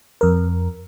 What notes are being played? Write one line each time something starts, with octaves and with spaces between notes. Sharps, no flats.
F2 A#4